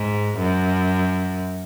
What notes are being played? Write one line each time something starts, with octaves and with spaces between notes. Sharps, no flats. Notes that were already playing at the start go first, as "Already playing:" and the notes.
Already playing: G#2
F#2